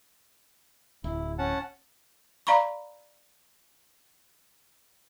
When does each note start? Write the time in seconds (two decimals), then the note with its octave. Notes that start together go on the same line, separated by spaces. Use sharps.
1.04 D1 E4
1.38 C#4 F#5 A5
2.47 D5 F5 A#5 B5 C#6